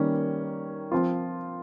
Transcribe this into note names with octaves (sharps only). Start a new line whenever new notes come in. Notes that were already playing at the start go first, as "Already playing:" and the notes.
Already playing: D#3 G3 A#3 C#4
F3 C4 F4